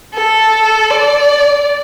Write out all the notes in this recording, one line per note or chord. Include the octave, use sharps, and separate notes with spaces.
A4
D5